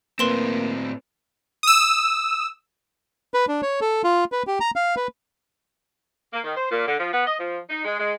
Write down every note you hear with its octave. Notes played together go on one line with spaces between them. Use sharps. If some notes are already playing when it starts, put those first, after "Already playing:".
A2 A#3 C4 B4 C6 E7
D#6 E6
B4
D4
C#5
A4
F4
B4
G4
A#5
F5
B4
A#3
D#3
C5
A#2
D3
F3
B3
D#5
F3
D#4
G#3
G#3